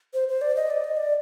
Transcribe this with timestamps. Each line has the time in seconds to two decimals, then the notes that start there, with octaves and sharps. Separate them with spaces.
0.14 C5
0.29 C5
0.42 D5
0.56 D#5
0.70 D5
0.84 D#5
0.97 D5